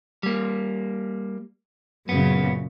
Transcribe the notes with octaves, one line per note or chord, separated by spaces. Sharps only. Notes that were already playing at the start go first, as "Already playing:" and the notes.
G3 A#3
F#2 A#2 C#3 B3